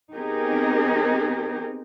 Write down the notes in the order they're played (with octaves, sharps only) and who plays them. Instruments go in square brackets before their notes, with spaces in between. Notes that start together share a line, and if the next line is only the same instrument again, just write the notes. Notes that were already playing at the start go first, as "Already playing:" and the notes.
[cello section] B3 C4 D#4 G4 G#4 A#4